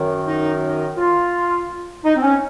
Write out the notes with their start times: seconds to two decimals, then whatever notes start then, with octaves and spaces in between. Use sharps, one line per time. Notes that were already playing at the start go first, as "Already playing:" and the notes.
Already playing: F#2 D#3
0.26 D#4
0.61 D#4
0.97 F4
2.04 D#4
2.16 C4
2.22 C#4